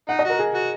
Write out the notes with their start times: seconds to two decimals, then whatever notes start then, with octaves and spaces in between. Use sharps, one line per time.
0.08 D#4 F#5
0.19 D#5
0.25 F#4
0.30 A#4
0.39 G#4
0.54 F#4